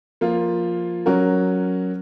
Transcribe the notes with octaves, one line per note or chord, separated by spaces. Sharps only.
F3 A#3 F4
F#3 C#4 F#4 A#4